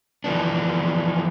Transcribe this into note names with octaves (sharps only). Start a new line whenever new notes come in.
E3 F3 B3 D4